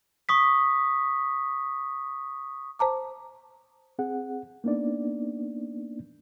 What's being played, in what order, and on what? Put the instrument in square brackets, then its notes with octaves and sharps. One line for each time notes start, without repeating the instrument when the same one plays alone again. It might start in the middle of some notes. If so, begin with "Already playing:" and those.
[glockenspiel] C#6 D#6 B6
[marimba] C5 A5 A#5 D6
[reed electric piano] C4 G#4 F#5
A#3 B3 D4 D#4 D5